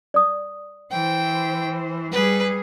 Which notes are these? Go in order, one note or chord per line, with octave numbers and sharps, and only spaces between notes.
D5 D#6
E3 C5 G5
G3 G#4 B4